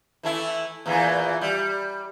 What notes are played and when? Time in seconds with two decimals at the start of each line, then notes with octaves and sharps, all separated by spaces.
0.23 E3 A3 E4
0.86 E2 A#2 E3
1.41 G3